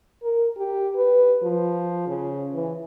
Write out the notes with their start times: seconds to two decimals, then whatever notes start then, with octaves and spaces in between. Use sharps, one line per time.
0.23 A#4
0.57 G4
0.96 B4
1.42 F3
2.07 C#3
2.53 E3